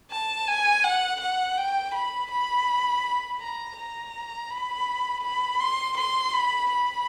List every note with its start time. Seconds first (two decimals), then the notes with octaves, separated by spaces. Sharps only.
0.11 A5
0.48 G#5
0.84 F#5
1.21 F#5
1.58 G5
1.94 B5
2.31 B5
3.40 A#5
3.76 A#5
4.50 B5
5.23 B5
5.60 C6
5.97 C6
6.33 B5
6.70 B5